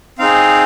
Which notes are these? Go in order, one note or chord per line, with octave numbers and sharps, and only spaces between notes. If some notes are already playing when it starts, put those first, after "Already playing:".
C4 D#4 G#4 F5